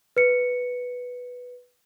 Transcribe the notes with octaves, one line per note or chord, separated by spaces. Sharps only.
B4 C#7